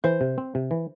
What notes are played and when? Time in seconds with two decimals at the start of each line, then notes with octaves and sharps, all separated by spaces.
0.04 E3 C5
0.21 C3
0.38 C4
0.55 C3
0.71 E3